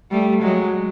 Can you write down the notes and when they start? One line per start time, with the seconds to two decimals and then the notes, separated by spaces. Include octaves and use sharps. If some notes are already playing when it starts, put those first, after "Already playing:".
0.11 G3 A3
0.42 F#3 G#3